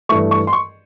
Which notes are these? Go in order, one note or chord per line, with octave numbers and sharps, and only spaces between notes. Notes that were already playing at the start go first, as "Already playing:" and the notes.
G2 E3 A3 C#6
C#6
C6
C#6